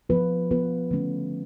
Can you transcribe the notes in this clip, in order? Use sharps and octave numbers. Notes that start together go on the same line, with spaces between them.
F3 B3 F4 B4
F3 B3 F4 B4
D3 F3 A3 C#4